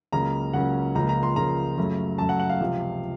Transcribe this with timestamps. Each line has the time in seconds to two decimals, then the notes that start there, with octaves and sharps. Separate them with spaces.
0.12 C#2 C#3 F#3 A#3 C#4 A#5
0.53 C#2 C#3 F#3 A#3 C#4 F#5
0.95 C#2 C#3 F3 A#3 A#5
1.09 A#5
1.23 C6
1.36 C#2 C#3 F3 A#3 A#5
1.77 F#2 C#3 F#3 A3 C#4
2.18 F#2 C#3 F#3 A3 C#4 A5
2.29 F#5
2.40 F#5
2.49 F5
2.60 C#2 C3 F3